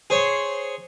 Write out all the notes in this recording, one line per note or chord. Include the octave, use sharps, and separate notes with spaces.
G#4 C5 C#5